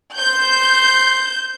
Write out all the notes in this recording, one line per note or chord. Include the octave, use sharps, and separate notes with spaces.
C5 G6